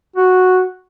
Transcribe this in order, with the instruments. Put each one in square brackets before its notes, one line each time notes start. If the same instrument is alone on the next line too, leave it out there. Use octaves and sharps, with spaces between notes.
[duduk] F#4